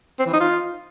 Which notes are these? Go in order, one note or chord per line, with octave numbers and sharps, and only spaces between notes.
C4
E3
D#4
F4